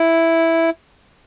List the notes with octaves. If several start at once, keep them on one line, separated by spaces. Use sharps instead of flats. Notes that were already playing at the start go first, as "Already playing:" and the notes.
Already playing: E4